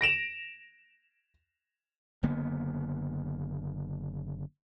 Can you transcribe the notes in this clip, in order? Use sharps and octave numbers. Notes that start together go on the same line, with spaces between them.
A#6 D7 E7 F7
F#1 D3 A#3 B3